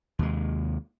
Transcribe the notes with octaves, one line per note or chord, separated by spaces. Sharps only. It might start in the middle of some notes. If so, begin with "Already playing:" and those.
D#2 C3 G#3